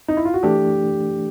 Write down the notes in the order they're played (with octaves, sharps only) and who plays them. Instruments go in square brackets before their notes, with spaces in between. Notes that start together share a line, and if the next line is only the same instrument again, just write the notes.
[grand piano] D#4
E4
F4
F#4
[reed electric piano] E3 A3 D4 [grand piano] G4